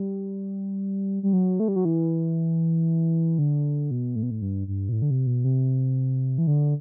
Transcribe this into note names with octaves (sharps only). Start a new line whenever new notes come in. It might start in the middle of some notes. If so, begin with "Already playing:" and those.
Already playing: G3
G3
F#3
A3
G3
F#3
E3
D3
B2
A2
B2
A2
G2
G2
B2
A2
D3
C3
B2
C3
E3
D3